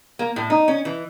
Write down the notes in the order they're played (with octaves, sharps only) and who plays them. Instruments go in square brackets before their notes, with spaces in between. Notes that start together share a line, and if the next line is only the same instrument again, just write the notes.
[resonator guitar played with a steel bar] A#3
A2
D#4
C#4
E3